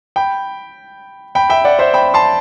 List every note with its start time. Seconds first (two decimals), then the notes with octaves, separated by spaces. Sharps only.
0.16 G5 B5
1.35 G5 B5
1.50 E5 G5
1.65 D5 F#5
1.79 C5 E5
1.94 G5 B5
2.14 A5 C6